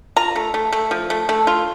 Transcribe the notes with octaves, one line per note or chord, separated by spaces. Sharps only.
F4 A#5
A3
A3
A3
F3
A3
A3
F4